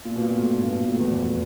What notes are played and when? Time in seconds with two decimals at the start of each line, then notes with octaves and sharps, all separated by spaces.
0.05 A#2
0.16 B2
0.21 A#2
0.37 A2
0.53 G2
0.68 B2
0.80 A#2
0.90 A2
1.00 E2
1.11 F2